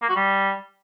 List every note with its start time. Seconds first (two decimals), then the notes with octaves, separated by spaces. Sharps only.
0.02 A#3
0.09 F#4
0.16 G3